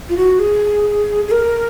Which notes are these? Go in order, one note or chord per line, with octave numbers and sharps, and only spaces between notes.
F4
F#4
G#4
G#4
A#4